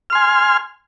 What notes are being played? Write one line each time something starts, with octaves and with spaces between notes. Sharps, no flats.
G#5 C6 F6